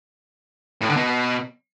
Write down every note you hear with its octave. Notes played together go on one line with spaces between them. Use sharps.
A2
D3
B2